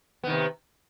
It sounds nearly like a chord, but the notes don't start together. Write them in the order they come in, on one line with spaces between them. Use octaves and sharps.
B3 D#3 C3